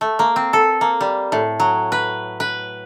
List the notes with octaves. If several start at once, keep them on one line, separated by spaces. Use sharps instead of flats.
A3
A#3
C4
A4
A#3
G3
A2
F#3
B4
B4